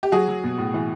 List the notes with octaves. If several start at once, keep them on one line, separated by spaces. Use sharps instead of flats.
G4
F#3 F#4 G#4
F#3
B2
A2
E3